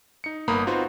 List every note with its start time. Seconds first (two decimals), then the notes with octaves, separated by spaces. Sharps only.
0.24 D#4 C#7
0.48 G1 A#3 B3 A#5 B5 D#6
0.67 C4 D#4 F4 F#4 B4 C5